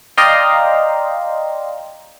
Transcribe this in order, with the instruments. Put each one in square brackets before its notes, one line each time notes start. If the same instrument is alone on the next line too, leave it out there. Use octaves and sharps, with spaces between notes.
[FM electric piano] D5 D#5 F5 G5 A#5 C6